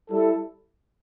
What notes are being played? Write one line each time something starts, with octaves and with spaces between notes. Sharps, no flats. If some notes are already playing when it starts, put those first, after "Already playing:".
G3 E4 A4